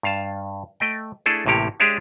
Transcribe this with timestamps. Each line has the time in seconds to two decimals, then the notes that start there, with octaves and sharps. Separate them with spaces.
0.03 G2 F5 A5
0.80 A3 D#5 G5
1.26 A3 D4 E4 G#4 A4
1.46 A1 A2 C3 A#3 G4 C#5
1.80 G#3 D4 G4 G#4 C#5 E5